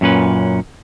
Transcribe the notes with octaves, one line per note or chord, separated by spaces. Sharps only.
F#2 A#2 C#4 B4